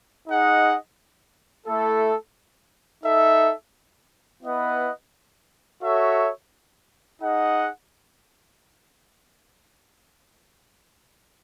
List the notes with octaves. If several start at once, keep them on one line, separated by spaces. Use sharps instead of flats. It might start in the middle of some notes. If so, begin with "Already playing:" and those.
D#4 G#4 D#5 F#5
A3 E4 A4
D#4 A4 E5
B3 E4 B4 D#5 F#5
F#4 A4 C#5 E5
D#4 G#4 D#5 F#5